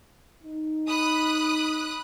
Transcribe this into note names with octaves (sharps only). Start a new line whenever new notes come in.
D#4
B5 D#6 F#6